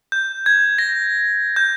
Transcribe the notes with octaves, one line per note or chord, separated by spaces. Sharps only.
G6
G#6
A#6
G6